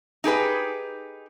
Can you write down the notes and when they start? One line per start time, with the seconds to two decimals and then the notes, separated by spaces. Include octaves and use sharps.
0.24 D#4 G4 G#4 B4